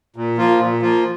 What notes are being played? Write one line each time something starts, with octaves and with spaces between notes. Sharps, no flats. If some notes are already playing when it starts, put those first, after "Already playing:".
A#2
F3 A#3 F4
A#2
F3 A#3 F4